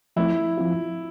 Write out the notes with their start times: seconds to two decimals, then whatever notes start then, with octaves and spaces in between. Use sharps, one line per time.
0.16 F3 A3 C4 E4
0.58 F3 C4 F4